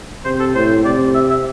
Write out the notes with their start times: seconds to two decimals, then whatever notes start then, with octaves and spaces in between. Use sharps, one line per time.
0.25 C3 C5
0.40 A4
0.55 A2 C5
0.85 C3 D5
1.15 E5
1.30 E5